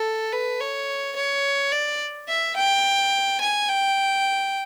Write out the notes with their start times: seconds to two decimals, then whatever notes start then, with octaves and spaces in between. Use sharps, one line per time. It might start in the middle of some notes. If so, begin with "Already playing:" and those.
Already playing: A4
0.32 B4
0.60 C#5
1.16 C#5
1.72 D5
2.28 E5
2.56 G5
3.41 G#5
3.69 G5